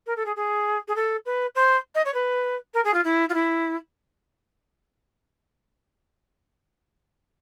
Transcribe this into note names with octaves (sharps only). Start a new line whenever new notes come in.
A#4
A4
G#4
G#4
G#4
A4
B4
C5
D#5
C#5
B4
A#4
G#4
F4
E4
F4
E4